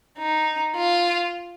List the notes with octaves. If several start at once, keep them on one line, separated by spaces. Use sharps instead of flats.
D#4
F4